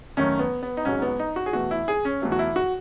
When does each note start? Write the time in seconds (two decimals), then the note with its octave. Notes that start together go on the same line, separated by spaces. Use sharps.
0.17 F#2 D#3 A3 C#4
0.39 B3
0.63 B3
0.77 D#4
0.85 G#1 G#2 F#3 C#4
1.02 B3
1.19 D#4
1.36 F#4
1.46 G#4
1.53 E2 B2 A3 F#4
1.71 E4
1.88 G#4
2.05 C#4
2.22 E2 B2 F#3 A3
2.32 F#4
2.39 E4
2.56 F#4